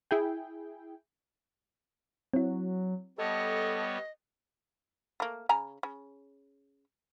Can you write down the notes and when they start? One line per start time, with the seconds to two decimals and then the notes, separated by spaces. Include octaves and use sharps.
0.11 E4 G#4 G5
2.34 F#3 C4 E4
3.18 G3 B3 A4 C#5 D#5
5.20 A3 A#3
5.49 C#3 G#5 A#5
5.83 C#3